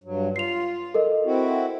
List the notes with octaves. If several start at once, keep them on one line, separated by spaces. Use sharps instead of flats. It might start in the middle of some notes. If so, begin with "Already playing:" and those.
G2 F#3
F4 C7 F7
A4 A#4 D#5
C4 E4 F#4